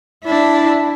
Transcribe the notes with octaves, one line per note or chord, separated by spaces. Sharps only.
D4 E4